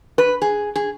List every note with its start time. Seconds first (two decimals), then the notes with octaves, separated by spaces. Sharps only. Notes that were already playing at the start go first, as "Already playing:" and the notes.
0.18 B4
0.42 G#4
0.76 G#4